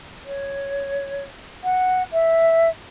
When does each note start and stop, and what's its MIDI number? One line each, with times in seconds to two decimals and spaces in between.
0.26 1.24 73
1.64 2.03 78
2.13 2.69 76